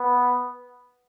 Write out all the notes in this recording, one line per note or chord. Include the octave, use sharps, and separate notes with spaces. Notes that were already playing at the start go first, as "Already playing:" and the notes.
Already playing: B3